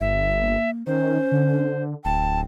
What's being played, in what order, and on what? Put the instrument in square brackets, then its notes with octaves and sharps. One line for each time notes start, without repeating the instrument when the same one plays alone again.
[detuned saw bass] G1 [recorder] E5
[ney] A#3
[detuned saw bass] D#3 [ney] C#4 [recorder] C5
[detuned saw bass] D3
[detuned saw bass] D1 [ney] G5 [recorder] A5